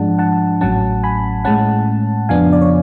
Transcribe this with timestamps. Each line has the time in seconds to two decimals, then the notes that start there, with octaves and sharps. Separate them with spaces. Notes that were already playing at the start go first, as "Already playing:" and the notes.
Already playing: G#2 F3 G#3 D4 F#5 A5
0.19 F#5 A5
0.61 A1 A2 F#3 C#4 F#5 A5
1.03 G#5 B5
1.45 A2 G#3 C#4 F#5 A5
2.29 F2 C#3 F3 B3 D4 F5 G#5
2.53 D5
2.61 C#5